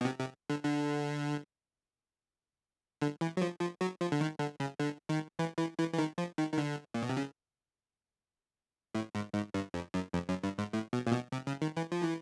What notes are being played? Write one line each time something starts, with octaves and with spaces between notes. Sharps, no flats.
B2
C3
C3
D3
D3
D3
E3
F#3
F3
F3
F#3
F3
D3
D#3
D3
C#3
D3
D#3
E3
E3
E3
E3
D#3
F3
D#3
D#3
D3
A#2
B2
C3
C#3
A2
G#2
G#2
G2
F2
F#2
F2
F#2
G2
G#2
A2
B2
A#2
B2
C3
C#3
D#3
E3
F3
E3